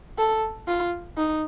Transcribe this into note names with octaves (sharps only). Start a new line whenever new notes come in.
A4
F4
D#4